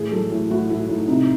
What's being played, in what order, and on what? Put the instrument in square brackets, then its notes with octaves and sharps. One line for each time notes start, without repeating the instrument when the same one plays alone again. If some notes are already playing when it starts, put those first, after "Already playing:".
Already playing: [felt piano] A2 E3 G#4
F#3 A4
A2
A2 F#4
A2 E4
A2 D#4
C3 D#4